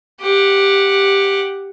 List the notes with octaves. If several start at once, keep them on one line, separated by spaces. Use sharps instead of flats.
G4 F#5